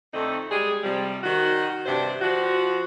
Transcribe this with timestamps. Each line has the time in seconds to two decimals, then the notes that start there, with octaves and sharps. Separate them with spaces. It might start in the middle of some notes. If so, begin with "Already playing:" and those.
0.14 F2 D3 A3 C4 D#4
0.51 G3 G#3 G4 G#4
0.83 C3 F3 G3
1.24 D#3 F#4
1.86 G2 C3 D4 C5
2.22 F3 F#4